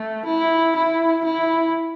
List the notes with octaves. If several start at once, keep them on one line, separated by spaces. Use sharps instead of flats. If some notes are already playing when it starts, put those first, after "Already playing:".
Already playing: A3
E4
E4
E4